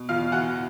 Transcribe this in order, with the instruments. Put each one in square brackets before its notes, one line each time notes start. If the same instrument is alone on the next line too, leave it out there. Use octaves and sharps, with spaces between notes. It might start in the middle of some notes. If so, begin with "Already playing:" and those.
Already playing: [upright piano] B2
E2 F4 F5
E3 F#4 F#5